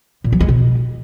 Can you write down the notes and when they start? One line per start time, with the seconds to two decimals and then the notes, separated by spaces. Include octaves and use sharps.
0.24 A#2
0.32 F#3
0.40 G#3
0.48 B2